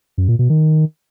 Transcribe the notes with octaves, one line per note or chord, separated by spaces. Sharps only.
F#2
A#2
B2
D#3